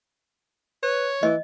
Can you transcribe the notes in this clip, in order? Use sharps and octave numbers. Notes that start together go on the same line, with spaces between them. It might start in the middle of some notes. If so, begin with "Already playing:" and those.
B4 C#5
E3 D#5